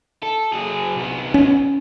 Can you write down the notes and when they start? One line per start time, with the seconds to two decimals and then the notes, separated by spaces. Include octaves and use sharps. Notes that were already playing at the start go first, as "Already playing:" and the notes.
0.23 A4
0.53 F#3 G#4
0.95 C2 B3
1.34 C#4